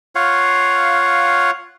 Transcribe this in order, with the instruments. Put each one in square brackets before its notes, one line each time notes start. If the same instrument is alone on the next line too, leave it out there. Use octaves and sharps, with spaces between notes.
[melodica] F4 C#5 F5 F#5